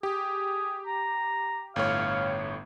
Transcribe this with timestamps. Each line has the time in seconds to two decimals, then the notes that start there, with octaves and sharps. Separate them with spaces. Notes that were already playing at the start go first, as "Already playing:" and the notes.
0.03 G4 G#4
0.87 A#5
1.76 G1 A2 C#5 F5